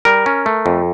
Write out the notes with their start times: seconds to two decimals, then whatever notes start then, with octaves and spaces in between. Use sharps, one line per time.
0.05 G3 A#4
0.26 C#4
0.46 A3
0.66 F2